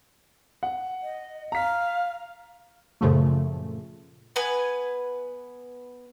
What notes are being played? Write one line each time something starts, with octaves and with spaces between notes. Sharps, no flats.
F#5
D#5
F5 A#5 B6
F#2 A#2 C#3 F3 A3
B3 B4 G#5